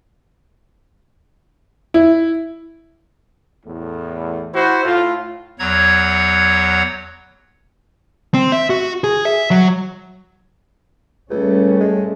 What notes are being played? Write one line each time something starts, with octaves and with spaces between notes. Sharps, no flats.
E4
E2 A2
E4 F#4 C5
A2 F4
E2 F#3 C#5 F#5 A#5 G#6
C4
E5
F#4
G#4
E5
F#3
C#2 G3 A3 C#4
G#3